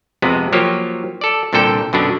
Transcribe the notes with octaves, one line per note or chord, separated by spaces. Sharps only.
F2 C3 G#3 B3
F3 F#3 A#3 G4 C#5
A4 D5
C2 A#2 D3 A4 G5
F#2 B2 D3 D4